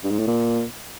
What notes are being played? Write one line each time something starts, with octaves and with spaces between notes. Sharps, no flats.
G2
G#2
A2
A#2